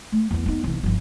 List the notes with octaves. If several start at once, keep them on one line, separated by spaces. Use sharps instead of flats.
A3
E2 B3
B3 D#4
C2 E3
G1 F3